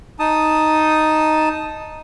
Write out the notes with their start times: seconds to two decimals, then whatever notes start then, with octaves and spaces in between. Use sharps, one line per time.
0.19 D#4 A5 D#6